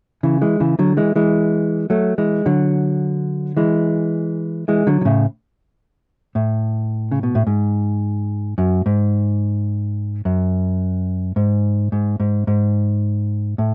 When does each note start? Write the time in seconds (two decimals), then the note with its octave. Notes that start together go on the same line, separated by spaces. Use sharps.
0.23 C#3 E3
0.41 E3 G#3
0.60 C#3 E3
0.79 D3 F#3
0.97 E3 G#3
1.16 E3 G#3
1.90 F#3 A3
2.18 E3 G#3
2.46 D3 F#3
3.57 E3 G#3
4.68 E3 G#3
4.87 D3 F#3
5.01 D3
5.05 A2 C#3
6.35 A2
7.11 C#3
7.23 B2
7.35 A2
7.47 G#2
8.58 F#2
8.86 G#2
10.25 F#2
11.36 G#2
11.92 G#2
12.20 G#2
12.47 G#2
13.58 A2